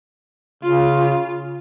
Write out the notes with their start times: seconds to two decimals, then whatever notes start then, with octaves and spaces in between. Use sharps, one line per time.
0.63 C#3 F4